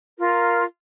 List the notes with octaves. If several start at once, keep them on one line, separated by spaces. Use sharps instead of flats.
F4 A#4